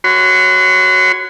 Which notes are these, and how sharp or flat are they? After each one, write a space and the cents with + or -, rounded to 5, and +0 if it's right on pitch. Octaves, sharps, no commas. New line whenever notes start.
F#4 +0 C#5 +0 C6 -45